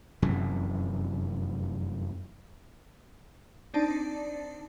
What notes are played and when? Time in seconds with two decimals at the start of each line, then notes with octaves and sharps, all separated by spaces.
0.22 F1 F#2 C3 E3
3.74 C4 D4 D#4 D5 A5